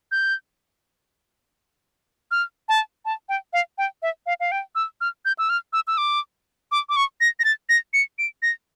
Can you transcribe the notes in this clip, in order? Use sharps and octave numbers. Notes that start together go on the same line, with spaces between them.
G6
F6
A5
A5
G5
F5
G5
E5
F5
F5
G5
E6
F6
G6
E6
F6
E6
E6
D6
D6
D6
C#6
A#6
A#6
A6
A#6
C#7
D7
A#6